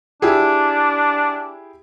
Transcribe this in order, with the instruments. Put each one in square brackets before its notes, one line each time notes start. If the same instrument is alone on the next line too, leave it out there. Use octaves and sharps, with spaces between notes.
[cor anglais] D4 [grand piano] E4 G4 G#4